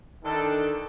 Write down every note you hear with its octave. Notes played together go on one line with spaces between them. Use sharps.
D3 D#3 D4 A4